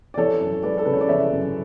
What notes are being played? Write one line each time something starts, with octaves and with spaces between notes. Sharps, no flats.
D5
E3 A4 C#5
F#2
G#3 B4 D5
A4
C#3 B4
C#5
D5
E3 C#5 E5
F#2